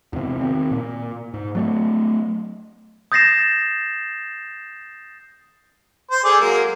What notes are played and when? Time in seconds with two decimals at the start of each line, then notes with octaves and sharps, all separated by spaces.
0.13 E2 C3
0.41 D#3 C4
0.71 A#2
1.34 G#2
1.55 F#3 A3
3.12 D#6 G6 A6 A#6 C7 E7
6.11 C5
6.24 G#4 A4 D5
6.40 F#3 G#3 A#3